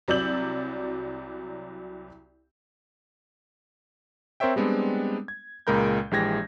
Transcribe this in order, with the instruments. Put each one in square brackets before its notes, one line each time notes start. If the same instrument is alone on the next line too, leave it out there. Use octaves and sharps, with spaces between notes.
[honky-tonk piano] C2 F#3 D5 E6 G6 F#7
[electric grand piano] C4 A#4 C5 C#5 E5 G5
G3 G#3 B3 C4 D4
G#6
C#2 A#2 G#3 A#4 B5 G6
A#1 E3 G#3 G4 G#6 A#6